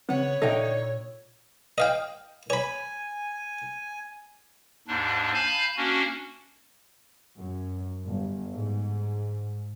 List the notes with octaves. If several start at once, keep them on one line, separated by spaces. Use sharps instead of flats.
C#3 B3 C4 C#5 F#5
A#2 D3 D#4 A4 E5 G5
D#5 F5 G5
C#5 G#5 B5
D#2 G#2 D4
F5 G#5 A5 B5 G6
A#3 C#4 D4 F#4
F#2
G1
G#2